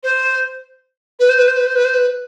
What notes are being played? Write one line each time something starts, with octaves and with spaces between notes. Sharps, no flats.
C5
B4
C5
B4
C5
B4
C5
B4
C5
B4